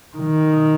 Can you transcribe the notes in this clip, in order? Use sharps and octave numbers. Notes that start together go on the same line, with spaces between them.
D#3